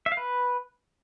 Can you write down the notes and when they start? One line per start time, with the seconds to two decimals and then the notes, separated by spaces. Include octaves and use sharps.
0.06 E5
0.12 F5
0.17 B4